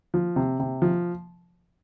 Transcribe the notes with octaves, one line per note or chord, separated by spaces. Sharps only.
F3
C3
C3
F3